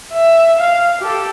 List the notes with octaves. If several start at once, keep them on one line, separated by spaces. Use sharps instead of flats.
E5
F5
G4 A4